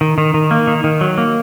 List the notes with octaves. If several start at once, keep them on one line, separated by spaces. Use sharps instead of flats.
D#3
D#3
D#3
A#3
D#3
D#3
F#3
A#3